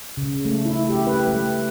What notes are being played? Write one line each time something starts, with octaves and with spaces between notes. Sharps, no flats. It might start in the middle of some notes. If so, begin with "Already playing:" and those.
C#3
A3
E4
G4
B4
A3